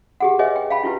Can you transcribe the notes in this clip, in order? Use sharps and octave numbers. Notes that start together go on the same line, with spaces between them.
G4 G#4 F#5
G#4 B4 C#5 D#5 E5 G#5
G5
F5 G5 A5 B5
E4 F4 G4 B4